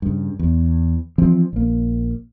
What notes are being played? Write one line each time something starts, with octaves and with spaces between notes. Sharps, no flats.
G2 C#3
E2
E3 F3 C4
A#1 A#3